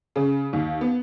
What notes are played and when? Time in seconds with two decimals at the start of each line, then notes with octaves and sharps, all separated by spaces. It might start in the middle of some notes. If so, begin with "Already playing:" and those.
0.16 C#3
0.53 D#2
0.81 B3